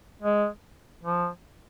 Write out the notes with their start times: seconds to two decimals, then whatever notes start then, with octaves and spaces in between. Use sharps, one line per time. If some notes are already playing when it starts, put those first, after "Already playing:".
0.22 G#3
1.03 F3